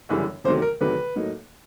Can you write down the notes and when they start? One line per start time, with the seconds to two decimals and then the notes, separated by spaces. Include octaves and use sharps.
0.09 G1 F#2 C#3 E3 G3
0.44 E2 C3 D#3 F#3 A3 C5
0.62 A#4
0.80 E2 C3 D#3 F#3 A3 B4
1.16 A2 F#3 A#3 D#4